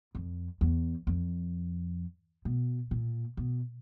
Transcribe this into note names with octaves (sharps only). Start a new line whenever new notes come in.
F2
E2
F2
B2
A#2
B2